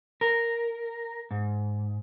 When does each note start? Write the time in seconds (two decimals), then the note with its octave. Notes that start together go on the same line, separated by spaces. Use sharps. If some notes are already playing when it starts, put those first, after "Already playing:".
0.21 A#4
1.31 G#2